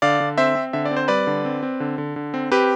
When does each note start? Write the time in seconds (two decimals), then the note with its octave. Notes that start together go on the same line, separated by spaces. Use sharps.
0.02 D3 D5 F5
0.20 D3
0.38 C4 C5 E5
0.55 C4
0.73 D3 E5
0.85 D5
0.91 C4
0.96 C5
1.08 G3 B4 D5
1.27 D3
1.45 C4
1.63 C4
1.80 D3
1.98 D3
2.16 D3
2.34 C4
2.51 C4 G4 B4